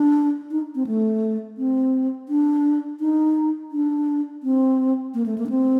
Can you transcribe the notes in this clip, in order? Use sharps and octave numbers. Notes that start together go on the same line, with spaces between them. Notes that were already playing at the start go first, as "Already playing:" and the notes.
Already playing: D4
D#4
C4
A3
C4
D4
D#4
D4
C4
A#3
A3
A#3
D4
C4